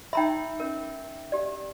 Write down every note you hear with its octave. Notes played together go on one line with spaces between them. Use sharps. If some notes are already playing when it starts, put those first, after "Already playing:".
D#4 E5 G5 A#5 B5
C#4 A#4
G4 D5